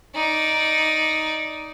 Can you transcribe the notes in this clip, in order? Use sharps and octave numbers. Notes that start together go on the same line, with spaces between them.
D#4 D5